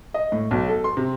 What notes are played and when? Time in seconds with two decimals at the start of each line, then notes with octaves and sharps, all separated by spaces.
0.14 D#5
0.32 A2
0.51 B1
0.68 A4
0.84 C6
0.97 C3